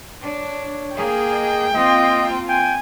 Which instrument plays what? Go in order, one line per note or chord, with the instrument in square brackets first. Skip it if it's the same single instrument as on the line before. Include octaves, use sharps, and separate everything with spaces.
[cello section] D4 [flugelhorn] C#5
[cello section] A#3 G#4 [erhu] G5
[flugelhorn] D#5
[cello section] A#3 C4 F4 [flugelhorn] D#5
[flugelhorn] G5 [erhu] G#5